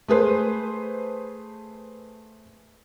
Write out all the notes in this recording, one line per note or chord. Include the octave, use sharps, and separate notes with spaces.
A3 G#4 B4 C5